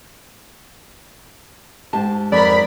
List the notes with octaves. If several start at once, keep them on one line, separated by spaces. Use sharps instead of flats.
G#2 G4 A5
F2 A#4 D5 B5